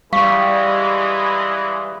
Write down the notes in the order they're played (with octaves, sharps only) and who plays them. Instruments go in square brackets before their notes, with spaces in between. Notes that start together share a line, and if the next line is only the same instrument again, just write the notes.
[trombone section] E3 G#3 [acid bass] G3 [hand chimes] F5 C#6 B6